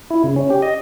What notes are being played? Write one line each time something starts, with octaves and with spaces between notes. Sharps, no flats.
E4
C#3
C#4
G4
D#5